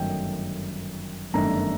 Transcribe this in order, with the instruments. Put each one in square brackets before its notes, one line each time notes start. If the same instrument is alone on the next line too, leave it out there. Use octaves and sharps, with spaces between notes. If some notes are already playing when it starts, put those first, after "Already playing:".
Already playing: [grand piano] G1 F#2 D#3 F#3 A3 G5
G1 F#2 D#3 A3 D4 A#5